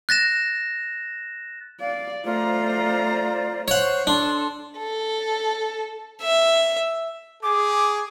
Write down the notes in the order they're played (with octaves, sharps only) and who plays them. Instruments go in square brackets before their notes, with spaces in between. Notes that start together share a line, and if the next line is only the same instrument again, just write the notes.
[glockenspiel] F#6 A6 A#6 E7
[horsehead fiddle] D5 [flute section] F5
[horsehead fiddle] A3 A#5 [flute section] F4 C5 D5
[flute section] C5 C#6 G6 [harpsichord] C#5 F#5
[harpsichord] D4 [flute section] A4 C6
[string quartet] A4
[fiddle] E5
[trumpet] G#4 [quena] D6